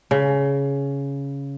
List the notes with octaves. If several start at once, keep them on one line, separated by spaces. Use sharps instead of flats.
C#3